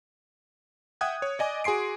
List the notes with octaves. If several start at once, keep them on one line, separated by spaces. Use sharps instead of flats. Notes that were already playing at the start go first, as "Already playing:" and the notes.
E5 F#5 G5 D#6 F#6 G#6
C#5
D5 D#5 G#5 D6
F#4 G#4 G#5 C6 C7 D7